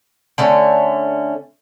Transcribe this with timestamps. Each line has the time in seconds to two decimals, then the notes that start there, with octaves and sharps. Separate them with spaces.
0.38 D3 A3 C#4